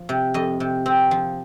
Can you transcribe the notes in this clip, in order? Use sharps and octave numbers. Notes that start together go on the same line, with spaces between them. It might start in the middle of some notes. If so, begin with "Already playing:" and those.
Already playing: F3
C3
F2 D#5
C3
C4
F3